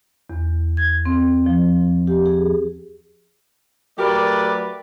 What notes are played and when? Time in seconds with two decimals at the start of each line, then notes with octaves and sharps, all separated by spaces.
0.30 E2
0.77 G#6
1.05 C4
1.46 F3
2.07 G4
2.26 G#4
3.99 F#3 A3 G4 A#4 B4 D5